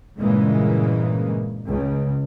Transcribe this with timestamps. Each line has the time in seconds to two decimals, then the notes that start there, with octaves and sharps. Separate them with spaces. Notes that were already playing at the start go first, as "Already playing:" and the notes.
0.18 G2 A#2 C#3 E3 G#3 A#3
1.67 C#2 C#3